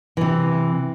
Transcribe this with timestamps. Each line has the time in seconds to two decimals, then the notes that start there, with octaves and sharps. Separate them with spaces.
0.17 C3 E3